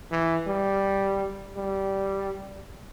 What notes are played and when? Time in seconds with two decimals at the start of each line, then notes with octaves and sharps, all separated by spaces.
0.11 E3
0.48 G3
1.57 G3